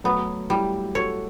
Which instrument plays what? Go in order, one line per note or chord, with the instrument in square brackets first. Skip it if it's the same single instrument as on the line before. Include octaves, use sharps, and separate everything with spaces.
[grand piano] F#3 A3 [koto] B3
[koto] G3 [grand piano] E4 G4
[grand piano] F#4 A4 [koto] C#5